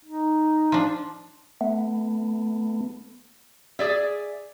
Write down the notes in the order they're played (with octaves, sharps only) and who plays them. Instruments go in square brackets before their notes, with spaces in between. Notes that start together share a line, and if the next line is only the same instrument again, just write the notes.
[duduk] D#4
[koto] F3 D4
[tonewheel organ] A3 B3
[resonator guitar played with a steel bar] G#4 D5 E5